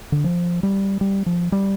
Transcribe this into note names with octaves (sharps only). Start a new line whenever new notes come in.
D3
F3
G3
G3
F3
G3